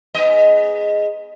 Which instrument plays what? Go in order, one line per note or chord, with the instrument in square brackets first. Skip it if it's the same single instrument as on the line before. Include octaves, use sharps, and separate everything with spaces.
[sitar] G#2 B3 D#5